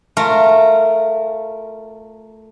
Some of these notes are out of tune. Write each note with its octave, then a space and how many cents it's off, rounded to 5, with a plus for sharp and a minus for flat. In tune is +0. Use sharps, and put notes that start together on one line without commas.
A3 +0 F4 +0 A#4 -20